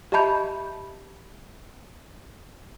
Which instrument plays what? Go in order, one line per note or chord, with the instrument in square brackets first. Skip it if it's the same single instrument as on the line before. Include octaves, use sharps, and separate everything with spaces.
[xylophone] G4 D#5 E5 A5 B5 G6